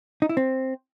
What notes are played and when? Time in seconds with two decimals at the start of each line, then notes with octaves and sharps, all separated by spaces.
0.22 D#4
0.29 E4
0.37 C4